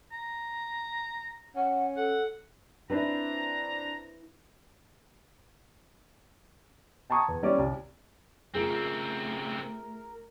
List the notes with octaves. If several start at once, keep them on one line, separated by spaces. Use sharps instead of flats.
A#5
C#4 F#5
A4 F#5
C4 D4 E4 B4 C5 A#5
G5 A5 A#5 C#6 D#6 G#6
E2
G3 C#4 D5
C2
C#3 A3 C4 F4 G#4 A#4